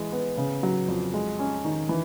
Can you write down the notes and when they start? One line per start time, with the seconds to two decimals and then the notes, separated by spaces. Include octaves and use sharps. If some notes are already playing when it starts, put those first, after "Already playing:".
Already playing: E3 G#3
0.12 B3
0.37 C#3
0.63 F#3
0.88 F2
1.14 G#3
1.39 C#4
1.65 D#3
1.89 E3